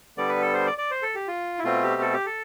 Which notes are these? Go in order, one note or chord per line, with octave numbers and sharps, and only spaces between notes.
D3 G3 B3 D5
B4
A4
C5
D5
D5
C5
A4
G4
F4
E4
B2 A3 C4 F4
G4
A4
G4
A4